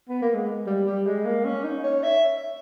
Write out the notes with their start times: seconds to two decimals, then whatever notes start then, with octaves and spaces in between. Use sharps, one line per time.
0.09 B3
0.22 A#3
0.34 G#3
0.67 G3
0.87 G3
1.07 G#3
1.26 A#3
1.45 C#4
1.64 D#4
1.84 C#5
2.03 E5